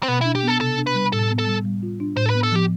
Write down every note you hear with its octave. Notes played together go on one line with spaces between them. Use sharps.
C4
B2 B3
D4 E4
G4
B3 A4
C3 A4
D4
B4
G3
A2 A4
B3
A4
G3
G3
F4
D4
A2 C5
A4
B4
B3
A4
F3 G4